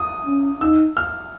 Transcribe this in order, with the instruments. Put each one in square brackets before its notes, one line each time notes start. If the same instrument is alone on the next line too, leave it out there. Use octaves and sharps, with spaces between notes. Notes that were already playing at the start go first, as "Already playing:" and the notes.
Already playing: [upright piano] D#6
[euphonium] C#4
[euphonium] D#4 [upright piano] E6
[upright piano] F6